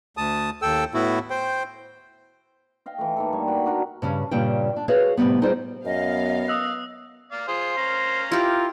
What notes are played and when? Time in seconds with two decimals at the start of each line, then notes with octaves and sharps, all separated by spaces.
0.17 D2 A5 D#6
0.62 D#2 A4 G5 E6
0.94 A2 B3 E4 F#4
1.30 C5 G5
2.86 D#5 F5 G5
2.98 E3 A3
3.16 A#3 D#4 A4
3.33 G2 G3 C#5 C#6
3.48 F#4 B5
3.66 D4 F#4 A#4
4.02 G2 C#3 C#4
4.31 G2 A#2 C#3 G3 D4 G5
4.76 D4
4.88 F#4 G#4 B4 C#5 F5
5.17 A2 C3 D#3 G3 B3
5.42 G3 D#4 F4 G#4 C5 D5
5.85 F#2 B3 D#5 F5
6.48 D#6 E6 F#6
7.32 D5 F5
7.48 F4 G#4 C5
7.77 C#4 F5 A#5
8.32 E4 F4 G4 A#4